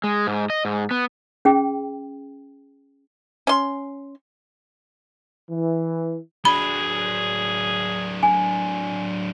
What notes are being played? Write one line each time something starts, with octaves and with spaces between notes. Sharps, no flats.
G#3
G#2
D#5
G#2
B3
C#4 G#4 G5
C#4 C6
E3
F#3 D4 G#4 B5
G#5